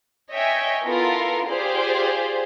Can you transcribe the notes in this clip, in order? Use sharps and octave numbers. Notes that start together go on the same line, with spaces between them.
C#5 D#5 E5 G5 G#5
B3 E4 F4 A4 A#4
F4 G4 G#4 C5 D5